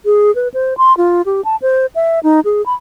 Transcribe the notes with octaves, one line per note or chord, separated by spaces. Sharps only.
G#4
B4
C5
C6
F4
G4
A5
C5
E5
D#4
G#4
B5